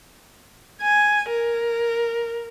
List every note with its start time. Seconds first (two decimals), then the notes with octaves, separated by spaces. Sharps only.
0.81 G#5
1.29 A#4